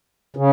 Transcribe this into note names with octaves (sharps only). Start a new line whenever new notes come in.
C#3